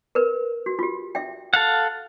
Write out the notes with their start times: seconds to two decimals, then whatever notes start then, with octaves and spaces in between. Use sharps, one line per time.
0.15 A#4 B4
0.66 F#4
0.79 F4 G4
1.15 E5 G5
1.54 A4 F5 F#5